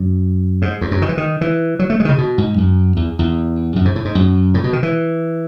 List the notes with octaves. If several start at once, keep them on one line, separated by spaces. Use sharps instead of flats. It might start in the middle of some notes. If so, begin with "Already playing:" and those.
Already playing: F#2
G#2
E2
F#2
D#3
E3
D#3
E3
F#3
A3
G#3
D#3
C#3
B2
G#2
F#2
E2
E2
F#2
G#2
A2
G#2
F#2
A2
B2
D#3
E3